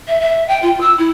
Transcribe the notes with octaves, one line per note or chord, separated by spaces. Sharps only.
E5
E5
G5
F4
E6
E4